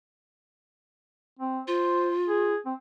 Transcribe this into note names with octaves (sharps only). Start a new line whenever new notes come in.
C4
F4 C5
G#4
C4